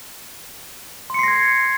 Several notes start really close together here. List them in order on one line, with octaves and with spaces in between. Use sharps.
C6 C#7 C7 A#6 G#6